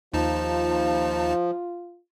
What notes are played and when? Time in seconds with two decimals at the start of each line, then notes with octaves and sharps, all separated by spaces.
0.13 D#2 F3 D#4 F4 A5